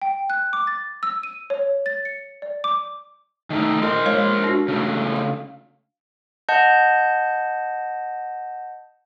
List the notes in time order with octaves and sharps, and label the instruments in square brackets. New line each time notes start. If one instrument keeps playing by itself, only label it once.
[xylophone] G5
F#6
D6
A6
E6
D#7
C#5
A6
C#7
D5
D6
[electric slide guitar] D#3 A3 D#4
[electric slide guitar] F4 A#4 C5 [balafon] D#5
[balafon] G#3 C#5 F5
D4 F#4
[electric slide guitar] C#3 A3
[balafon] F5
[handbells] D#5 F#5 A5 G6